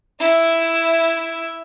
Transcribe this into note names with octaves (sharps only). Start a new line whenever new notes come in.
E4 E5